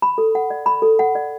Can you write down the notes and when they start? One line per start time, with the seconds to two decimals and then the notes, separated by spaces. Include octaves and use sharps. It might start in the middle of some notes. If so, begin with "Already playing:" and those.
0.02 B5
0.18 A4
0.35 F#5
0.50 D5
0.66 B5
0.82 A4
0.99 F#5
1.15 D5